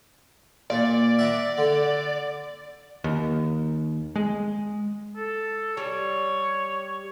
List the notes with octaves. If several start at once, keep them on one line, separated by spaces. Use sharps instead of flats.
A#2 D5
E5 F#5 A#5
D3
D#2
G#3
A4
G3 C#5